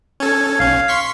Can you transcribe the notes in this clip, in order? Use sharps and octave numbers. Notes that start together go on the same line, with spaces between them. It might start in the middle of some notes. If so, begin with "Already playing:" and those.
C#4 A4 G#6
B1 C#4 F5
C6 C#6 B6